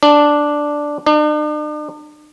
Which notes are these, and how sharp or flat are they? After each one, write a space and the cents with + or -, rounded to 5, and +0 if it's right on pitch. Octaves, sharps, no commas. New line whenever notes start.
D4 +0
D4 +45